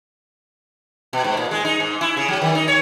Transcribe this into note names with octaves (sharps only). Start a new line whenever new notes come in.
B2
G#2
A#2
G#3
D#4
G#2
E4
C#3
F#3
D#3
D#4
C#5